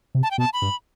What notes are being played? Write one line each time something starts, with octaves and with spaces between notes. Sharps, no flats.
C3
A5
G5
B2 A5
B5
G2